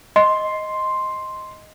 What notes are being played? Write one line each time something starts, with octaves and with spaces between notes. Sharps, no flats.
D#5 C6